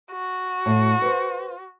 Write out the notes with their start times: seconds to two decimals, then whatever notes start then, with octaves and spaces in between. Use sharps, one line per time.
0.12 F#4
0.66 A2
1.02 B4 C5